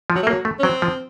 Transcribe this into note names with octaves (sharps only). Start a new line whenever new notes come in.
F3
F#3
A3
A#3
F#3
A3
C#4
F#3 C4
F3